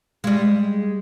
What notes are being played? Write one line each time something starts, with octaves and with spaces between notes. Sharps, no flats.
G3 G#3